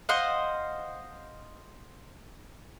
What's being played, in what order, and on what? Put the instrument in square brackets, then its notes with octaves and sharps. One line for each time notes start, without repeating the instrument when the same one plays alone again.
[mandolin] C5 D#5 F5 F#5